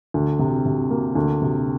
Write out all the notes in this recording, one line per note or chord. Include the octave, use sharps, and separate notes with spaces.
D2
C3
C3
A#3
D2
C3